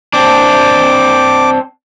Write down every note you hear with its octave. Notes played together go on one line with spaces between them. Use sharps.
C4 D4 D6